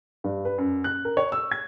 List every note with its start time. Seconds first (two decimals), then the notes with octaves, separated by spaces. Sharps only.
0.24 G2
0.45 B4
0.58 F#2
0.84 F#6
1.05 A#4
1.17 C#5
1.32 E6
1.52 G#6